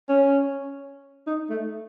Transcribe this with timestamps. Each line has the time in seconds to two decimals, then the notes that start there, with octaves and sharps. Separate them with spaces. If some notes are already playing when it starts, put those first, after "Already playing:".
0.09 C#4
1.27 D#4
1.50 A3